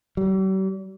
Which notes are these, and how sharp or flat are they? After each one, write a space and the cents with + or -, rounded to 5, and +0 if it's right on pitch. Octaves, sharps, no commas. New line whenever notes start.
G3 -45